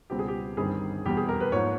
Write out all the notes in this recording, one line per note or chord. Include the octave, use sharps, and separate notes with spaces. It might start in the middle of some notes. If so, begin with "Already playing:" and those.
C#2 B2 G3 C4 G4
G#4
G4
G1 G2 D#3 G3 C4 G#4
F1 E2 B2 G3 G4
G#4
A#4
B4
G#2 F3 A#3 C#5